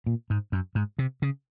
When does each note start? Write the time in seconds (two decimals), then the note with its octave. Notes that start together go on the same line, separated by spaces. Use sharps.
0.06 A#2
0.30 G#2
0.52 F#2
0.75 G#2
0.99 C3
1.22 C#3